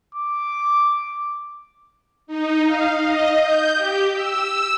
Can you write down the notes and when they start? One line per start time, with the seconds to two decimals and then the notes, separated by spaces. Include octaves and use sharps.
0.15 D6
2.27 D#4
2.65 F5
2.96 D#5
3.36 G6
3.74 G4
4.12 E6